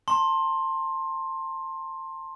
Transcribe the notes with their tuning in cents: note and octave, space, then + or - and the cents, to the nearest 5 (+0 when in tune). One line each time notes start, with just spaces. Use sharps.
A5 +35 C6 +20